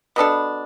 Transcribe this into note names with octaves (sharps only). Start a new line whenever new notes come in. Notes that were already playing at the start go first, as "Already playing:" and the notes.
B2 B3 D4 A4